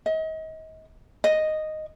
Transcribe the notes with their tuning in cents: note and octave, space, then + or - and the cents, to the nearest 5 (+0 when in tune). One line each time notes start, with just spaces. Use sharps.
D#5 +35
D#5 -5